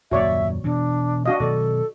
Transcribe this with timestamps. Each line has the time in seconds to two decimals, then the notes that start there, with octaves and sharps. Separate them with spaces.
0.11 D#1 F#2 A#3 F#4 C#5 D5 E5
0.64 B2 E3 D4
1.26 D4 F#4 D#5 F5
1.40 B2 D#3 F#3 A4 D5